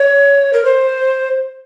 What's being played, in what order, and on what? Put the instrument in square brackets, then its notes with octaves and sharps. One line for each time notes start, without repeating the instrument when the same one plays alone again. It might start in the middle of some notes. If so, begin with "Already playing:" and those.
Already playing: [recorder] C#5
A#4
C5